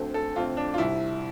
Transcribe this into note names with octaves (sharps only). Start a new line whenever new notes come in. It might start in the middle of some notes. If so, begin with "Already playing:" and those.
Already playing: D2 D3 A3 C4
A4
F2 D3 A3 C4 F4
D4
F4
C2 C3 G3 E4